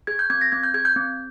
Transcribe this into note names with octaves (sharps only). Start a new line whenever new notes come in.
G#4 G#6
G6
C4 G#6
A#6
C4 G#6
G6
G#4 G#6
G6
C4